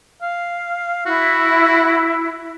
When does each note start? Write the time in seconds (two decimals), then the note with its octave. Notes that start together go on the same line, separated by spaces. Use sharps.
0.22 F5
1.06 E4 F#4